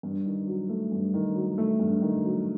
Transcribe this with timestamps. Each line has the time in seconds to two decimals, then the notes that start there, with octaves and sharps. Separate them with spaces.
0.03 G2
0.26 D#3
0.47 F#3
0.69 A3
0.92 G2
1.14 D#3
1.35 F#3
1.58 A3
1.80 G2
2.02 D#3
2.24 F#3